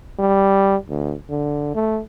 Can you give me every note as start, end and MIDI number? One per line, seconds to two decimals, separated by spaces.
0.19 0.76 55
0.89 1.15 38
1.30 1.74 50
1.75 2.00 57